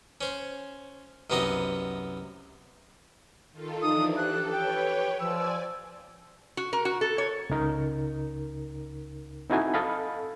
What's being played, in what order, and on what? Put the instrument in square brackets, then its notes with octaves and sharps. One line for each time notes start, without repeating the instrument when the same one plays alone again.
[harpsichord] C#4 C5
C2 F#2 B3 C4 D#4 D#5
[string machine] D#3 F4 A4
[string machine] E3 F3 D4 [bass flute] D#4 [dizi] D#6
[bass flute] G4 [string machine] A4 [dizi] F#6
[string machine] B4 C#5 [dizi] G5
[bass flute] F3 [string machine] D5 G#5 [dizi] E6
[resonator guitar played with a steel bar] F#4
A#4
F#4
A4
C#5
[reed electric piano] C#2 C#3 D#4 A#4
C4 D#4 E4 F#4 A4 G#5
A4 D#5 F5 B5